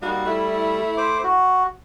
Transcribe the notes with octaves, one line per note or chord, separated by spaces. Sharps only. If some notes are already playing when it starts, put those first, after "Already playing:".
G3 A#3 D#4 F#4
A3 E4
C5 D6
F#4